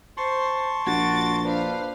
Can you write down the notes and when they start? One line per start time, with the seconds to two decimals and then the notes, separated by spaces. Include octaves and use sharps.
0.17 C5 A5 C6 C#6
0.87 A#1 F#4 A6 D7
1.44 D4 B4 C5 F5